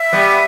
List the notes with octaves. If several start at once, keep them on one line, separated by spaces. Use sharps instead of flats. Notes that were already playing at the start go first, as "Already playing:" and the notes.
Already playing: E5
G3 B3